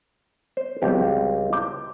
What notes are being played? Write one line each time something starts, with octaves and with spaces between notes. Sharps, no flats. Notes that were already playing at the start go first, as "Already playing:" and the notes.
C5
C#2 F#3 G3 C4 G4
D6 G6